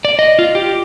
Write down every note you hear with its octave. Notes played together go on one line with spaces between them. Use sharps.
D5
D#5
F4
G4